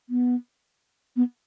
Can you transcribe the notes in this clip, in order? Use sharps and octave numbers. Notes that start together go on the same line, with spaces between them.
B3
B3